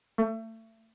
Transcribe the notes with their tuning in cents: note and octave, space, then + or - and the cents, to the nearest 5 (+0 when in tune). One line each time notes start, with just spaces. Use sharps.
A3 +30